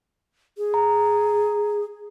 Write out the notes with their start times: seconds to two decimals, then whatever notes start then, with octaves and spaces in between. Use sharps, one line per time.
0.58 G#4
0.74 A#5